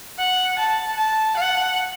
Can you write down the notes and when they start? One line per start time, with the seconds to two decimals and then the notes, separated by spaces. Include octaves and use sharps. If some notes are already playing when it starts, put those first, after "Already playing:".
0.18 F#5
0.59 A5
0.97 A5
1.37 F#5